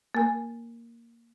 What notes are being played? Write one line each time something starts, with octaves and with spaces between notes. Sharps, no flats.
A#3 A#4 G#5